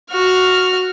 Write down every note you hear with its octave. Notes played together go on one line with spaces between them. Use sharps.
F#4 F6